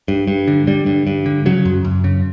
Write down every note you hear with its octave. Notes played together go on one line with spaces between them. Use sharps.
G2
G2
D3
D3 G3
G2
G2
D3
C#3 F#3
F#2
F#2
C#3